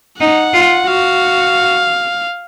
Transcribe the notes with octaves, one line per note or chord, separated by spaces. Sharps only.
D#4 F#5
F4
F#4 F5